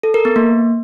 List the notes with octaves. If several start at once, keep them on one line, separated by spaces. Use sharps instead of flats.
A4
A#4
B3
A#3